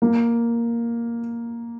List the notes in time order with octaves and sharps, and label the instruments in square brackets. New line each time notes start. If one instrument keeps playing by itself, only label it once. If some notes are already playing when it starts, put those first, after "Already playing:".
[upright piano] A#3